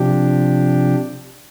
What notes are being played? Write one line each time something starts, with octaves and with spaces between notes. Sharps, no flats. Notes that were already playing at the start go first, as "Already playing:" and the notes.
Already playing: C3 F3 D4 G4